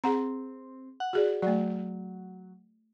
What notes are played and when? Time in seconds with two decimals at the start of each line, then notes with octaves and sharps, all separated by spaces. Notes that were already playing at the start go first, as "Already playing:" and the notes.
0.04 C4 G#4 F#5 A#5
1.00 F#5
1.13 F#4 G#4 D5
1.42 F#3 A3 D5